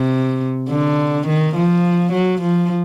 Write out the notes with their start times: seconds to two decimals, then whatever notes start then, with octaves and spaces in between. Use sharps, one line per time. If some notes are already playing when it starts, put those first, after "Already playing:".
Already playing: C3
0.69 D3
1.27 D#3
1.55 F3
2.12 F#3
2.41 F3